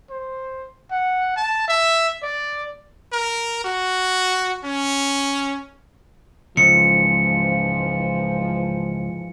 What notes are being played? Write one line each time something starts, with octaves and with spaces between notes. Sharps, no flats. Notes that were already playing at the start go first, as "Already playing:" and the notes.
C5
F#5
A5
E5
D5
A#4
F#4
C#4
C#2 G#2 E3 F3 C#7